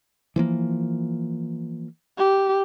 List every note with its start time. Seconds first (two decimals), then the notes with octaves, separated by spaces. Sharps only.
0.36 E3 F3 A#3
2.18 G4